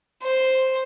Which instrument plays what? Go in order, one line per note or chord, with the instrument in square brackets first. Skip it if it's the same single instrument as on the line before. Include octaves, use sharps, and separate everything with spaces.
[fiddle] C5